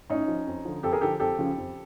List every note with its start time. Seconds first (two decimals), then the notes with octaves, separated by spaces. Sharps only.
0.10 A2 C#4 D#4
0.28 F3
0.47 F2
0.65 D3 F3
0.83 F2 G4 A4
0.93 G#4 A#4
1.01 D3 F3 G4 A4
1.20 F2 G4 A4
1.39 C#3 F3
1.57 F2